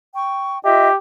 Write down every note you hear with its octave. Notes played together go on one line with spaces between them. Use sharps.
G5 C#6
F4 G4 D#5 E5